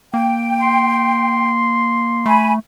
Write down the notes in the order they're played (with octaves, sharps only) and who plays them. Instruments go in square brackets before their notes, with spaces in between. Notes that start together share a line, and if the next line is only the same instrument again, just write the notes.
[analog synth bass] A#3 [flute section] G5
[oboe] C6
[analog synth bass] A3 [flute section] G#5 B5